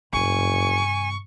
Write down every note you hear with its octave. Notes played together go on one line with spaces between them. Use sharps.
F#1 G2 C3 G#5 C#6